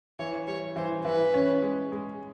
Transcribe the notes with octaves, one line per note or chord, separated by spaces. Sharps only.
E3 C#5
G3 C#5
E3 C5
E3 B4
C#4
G#3
G#3